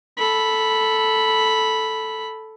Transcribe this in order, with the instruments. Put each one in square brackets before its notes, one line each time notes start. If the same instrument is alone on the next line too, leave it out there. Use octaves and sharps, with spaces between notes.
[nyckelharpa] A4 B5